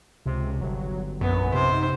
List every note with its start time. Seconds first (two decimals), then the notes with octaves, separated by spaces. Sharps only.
0.26 C#2 C3
0.61 G1 F#3
1.21 A#1 F#2 B3
1.54 C3 D#4 C5